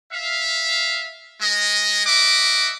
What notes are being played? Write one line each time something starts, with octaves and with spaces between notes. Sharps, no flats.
E5 F5
G#3 D#5
D#5 E5 F#5 D6